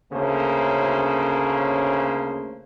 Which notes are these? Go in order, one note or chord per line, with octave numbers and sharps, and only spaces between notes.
D2 C#3 A3 A#3 C#4 C5